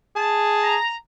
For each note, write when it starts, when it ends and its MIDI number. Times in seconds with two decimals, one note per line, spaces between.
0.16 0.78 68
0.16 0.75 81
0.63 0.95 82